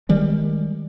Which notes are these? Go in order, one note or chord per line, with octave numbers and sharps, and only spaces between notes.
D#3 G3 G#3